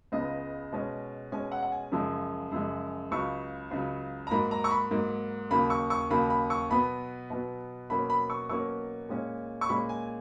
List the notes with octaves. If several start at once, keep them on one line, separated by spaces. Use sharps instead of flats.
C#2 C#3 G#3 B3 D#5
B2 G#3 C#4
B2 G#3 C#4 G#5
F#5
F#5
G#5
F#2 C#3 F3 G#3
F#2 C#3 F3 G#3
C#2 C#3 F#3 C#6
C#2 C#3 F#3
A#5
G#2 F#3 A#3 B5
A#5
C#6
B5
G#2 F#3 A#3
D#2 C#3 F#3 A#3 B5
C#6
C#6
D#2 C#3 F#3 A#3 B5
B5
C#6
B2 F#3 B3 B5
B2 F#3 B3
B2 F#3 A#3 C#4 B5
B5
C#6
B2 F#3 A#3 C#4 C#6
A#2 G#3 C#4
C#6
A#2 G#3 C#4 B5
G#5